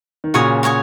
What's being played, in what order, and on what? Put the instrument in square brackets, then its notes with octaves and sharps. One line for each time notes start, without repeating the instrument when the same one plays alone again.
[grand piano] D#3
[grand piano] A#2 C#3 [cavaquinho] F#4 C#5 G#5 D#6
[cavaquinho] F#4 C#5 G#5 D#6